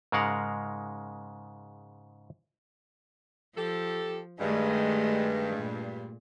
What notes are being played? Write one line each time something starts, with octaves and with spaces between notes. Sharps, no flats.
G#2 C#3 G#3 A#4 F5 F#5
F3 G4 A4
G2 D#3 G#3 A3
A#2